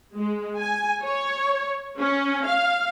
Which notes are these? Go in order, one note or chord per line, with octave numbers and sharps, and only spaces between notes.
G#3
G#5
C#5
C#4
F5